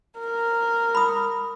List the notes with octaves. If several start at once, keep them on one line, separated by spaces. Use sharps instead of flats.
A#4
B5 D#6